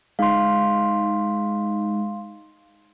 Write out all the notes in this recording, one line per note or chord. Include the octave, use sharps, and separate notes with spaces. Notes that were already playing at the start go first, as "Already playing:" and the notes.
G#3 D#4 F5 C6